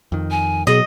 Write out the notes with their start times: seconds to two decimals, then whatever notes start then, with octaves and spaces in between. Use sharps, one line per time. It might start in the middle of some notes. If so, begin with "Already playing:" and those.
0.12 F2 D#3
0.31 G#5
0.67 B2 F#3 G#4 D#5